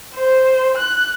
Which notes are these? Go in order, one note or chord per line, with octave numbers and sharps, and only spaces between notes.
C5
F#6